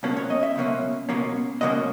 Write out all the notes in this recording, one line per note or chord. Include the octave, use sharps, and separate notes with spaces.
C#2 B2 F#3 A#3 C#4
C#5
D#5
E5
C#2 B2 F#3 A#3 C#4
C#2 B2 F#3 A#3 C#4
C#2 B2 F#3 A#3 C#4 D#5